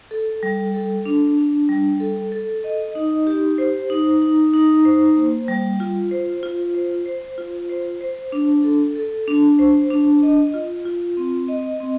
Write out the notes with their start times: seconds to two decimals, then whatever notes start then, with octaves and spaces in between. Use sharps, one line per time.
0.11 A4
0.43 G3
0.74 A4
1.06 D4
1.37 D4
1.69 G3
2.00 A4
2.32 A4
2.64 D#5
2.95 D#4
3.27 G4
3.58 C5
3.90 D#4
4.22 D#4
4.54 D#4
4.85 C5
5.16 A#3
5.48 G3
5.80 F4
6.11 C5
6.43 F4
6.75 C5
7.06 C5
7.38 F4
7.70 C5
8.01 C5
8.32 D4
8.64 A4
8.96 A4
9.28 D4
9.59 C5
9.90 D4
10.22 D#5
10.54 F4
10.85 F4
11.17 C4
11.48 D#5
11.81 C4